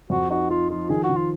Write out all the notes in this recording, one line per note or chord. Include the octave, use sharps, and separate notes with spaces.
F2 F#4
D#4 F#4
F3 F4
F3 F4
D#3 G#4
F#4
D#3
F4